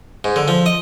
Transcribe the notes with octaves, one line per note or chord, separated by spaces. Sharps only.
G#2
D3
F3
D#5